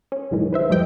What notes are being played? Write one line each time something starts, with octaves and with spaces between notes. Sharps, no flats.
C#4
C2 F#2 A#2 D#3 E3 G#3
B4 C5 E5
G1 D#2 F3 G3 D#5 G5